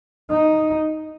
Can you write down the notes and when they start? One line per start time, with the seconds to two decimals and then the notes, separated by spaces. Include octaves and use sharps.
0.30 D#4